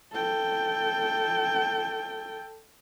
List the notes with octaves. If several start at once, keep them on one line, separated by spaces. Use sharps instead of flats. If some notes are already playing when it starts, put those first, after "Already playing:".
A4 G5